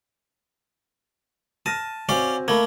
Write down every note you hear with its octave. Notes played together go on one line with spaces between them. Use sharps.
A5 F6 A#6 D#7
C4 C#4 F#4 D5 F5 G#5
A3 A#3 F5 B5 G#6